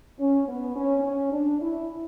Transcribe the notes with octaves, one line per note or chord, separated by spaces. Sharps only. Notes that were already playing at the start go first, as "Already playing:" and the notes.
C#4
B3
C#4
C#4
D4
E4